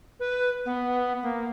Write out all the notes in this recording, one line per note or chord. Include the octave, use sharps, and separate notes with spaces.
B4
B3
A#3